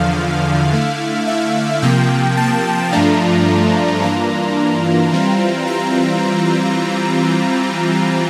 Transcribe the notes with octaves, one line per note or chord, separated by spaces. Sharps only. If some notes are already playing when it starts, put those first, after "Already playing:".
Already playing: E2 D3 F3 F5
D3 A3 E4
E5
C3 F3 A#3 G5
A5
G2 F3 A3 D4 F4 A#5
G2 E3 A#3 D4 F4 A#5
E3 G3 C4 F4
A#5